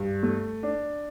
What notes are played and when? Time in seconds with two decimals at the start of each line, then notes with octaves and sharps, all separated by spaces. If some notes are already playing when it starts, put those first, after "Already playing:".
Already playing: G2
0.23 A3
0.63 D4